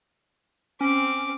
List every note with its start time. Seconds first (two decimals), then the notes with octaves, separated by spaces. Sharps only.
0.81 C4 C#4 D6